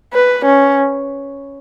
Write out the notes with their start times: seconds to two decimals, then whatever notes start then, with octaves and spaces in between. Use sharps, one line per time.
0.13 B4
0.45 C#4